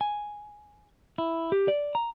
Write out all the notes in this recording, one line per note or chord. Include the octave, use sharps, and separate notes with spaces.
G#5
E4
G4
D5
A#5